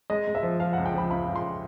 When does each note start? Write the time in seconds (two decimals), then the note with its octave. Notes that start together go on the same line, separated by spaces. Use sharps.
0.10 G#3 D#5
0.27 G#3
0.35 E5
0.43 F3
0.60 F3 F5
0.73 C#2 F#5
0.85 G5
0.94 F3 B5
1.10 C#2 B5
1.27 C#2
1.36 C6